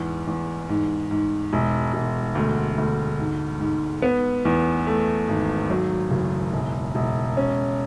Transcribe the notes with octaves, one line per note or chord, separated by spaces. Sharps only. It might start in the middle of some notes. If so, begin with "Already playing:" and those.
Already playing: E2 G#2
E2
G#2
G#2
E1
E1
D2
D2
G#2
G#2
B3
E2
A3
G#1
F#3
F#1
E1
E1
C#4